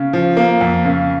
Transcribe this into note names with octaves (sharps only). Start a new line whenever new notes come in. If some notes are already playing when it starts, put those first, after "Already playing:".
Already playing: C#3
F3
A#3
F2
C#3